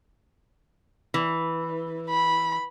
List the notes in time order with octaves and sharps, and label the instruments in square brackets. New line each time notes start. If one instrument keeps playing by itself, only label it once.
[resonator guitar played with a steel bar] E3
[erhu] B5